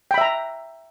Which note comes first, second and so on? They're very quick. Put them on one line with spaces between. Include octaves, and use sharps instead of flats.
G5 B5 E5 A#5